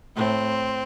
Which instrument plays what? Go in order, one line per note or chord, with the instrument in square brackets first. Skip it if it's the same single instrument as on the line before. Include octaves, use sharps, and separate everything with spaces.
[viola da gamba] A2 [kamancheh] C4